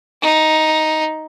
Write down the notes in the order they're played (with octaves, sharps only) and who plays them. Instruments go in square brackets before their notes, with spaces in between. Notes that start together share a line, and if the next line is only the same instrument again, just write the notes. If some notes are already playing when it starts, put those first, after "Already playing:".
[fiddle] D#4